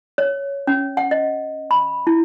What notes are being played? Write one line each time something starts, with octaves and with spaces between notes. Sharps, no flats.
C#5
C#4
F#5
D#5
B5
E4